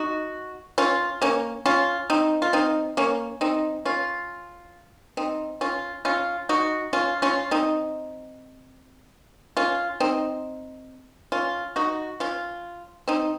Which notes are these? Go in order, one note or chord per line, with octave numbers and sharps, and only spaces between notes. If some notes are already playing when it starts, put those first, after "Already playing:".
Already playing: D#4 F#4
C#4 F4
A#3 C#4
C#4 F4
C4 D#4
F4
C4 D#4
A#3 C#4
C4 D#4
C#4 F4
C4 D#4
C#4 F4
C#4 F4
D#4 F#4
C#4 F4
C#4 F4
C4 D#4
C#4 F4
C4 D#4
C#4 F4
D#4 F#4
C#4 F4
C4 D#4